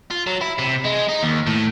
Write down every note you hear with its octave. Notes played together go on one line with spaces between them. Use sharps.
F4
F#3
E4
C3
G#3
D#4
D#2
A2